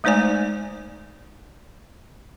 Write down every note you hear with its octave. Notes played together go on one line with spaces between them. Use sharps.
G#3 A3 D#4 C5 D5 G#5